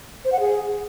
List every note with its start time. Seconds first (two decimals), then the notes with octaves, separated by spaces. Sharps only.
0.25 C5
0.32 F#5
0.40 G#4